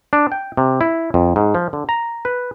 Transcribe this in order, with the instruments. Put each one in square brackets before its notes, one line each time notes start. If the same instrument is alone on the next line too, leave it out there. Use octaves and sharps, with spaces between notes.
[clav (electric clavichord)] D4
G5
C3
E4
F2
G#2
F3
D3
A#5
B4